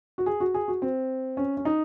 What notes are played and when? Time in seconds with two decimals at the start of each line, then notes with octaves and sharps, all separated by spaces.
0.18 F#4
0.26 G#4
0.40 F#4
0.54 G#4
0.68 F#4
0.82 C4
1.37 C#4
1.57 C#4
1.65 D#4